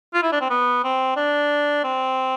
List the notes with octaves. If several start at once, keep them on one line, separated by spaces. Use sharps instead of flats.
F4
E4
D4
C4
B3
C4
D4
C4